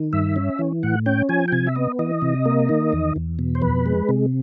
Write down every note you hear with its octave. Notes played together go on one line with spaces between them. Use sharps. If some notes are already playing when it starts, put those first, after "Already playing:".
Already playing: D#3
G2 E5
C#4
E3
A2 F#5
C#4 G5
F3 G#5
G5
C3 G#5
E5
B3 D#5
E3 D#5
C3
A#3
D#3
E2
E2
B2
C5
F2 B4
G#3
C3